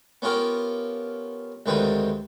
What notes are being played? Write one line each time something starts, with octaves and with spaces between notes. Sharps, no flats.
B3 C#4 F4 G4 A#4
D2 G#2 D#3 G3 C4 B4